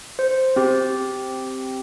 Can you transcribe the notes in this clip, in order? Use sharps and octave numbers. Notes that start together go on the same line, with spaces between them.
C5
C4 G4